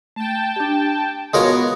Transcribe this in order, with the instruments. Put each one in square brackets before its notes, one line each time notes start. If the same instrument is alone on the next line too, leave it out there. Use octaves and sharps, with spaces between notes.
[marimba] A3 [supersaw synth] G5 A5
[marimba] D4 G4
[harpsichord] G#3 A#4 C#5 [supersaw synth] B3 [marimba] F4 F#4 F5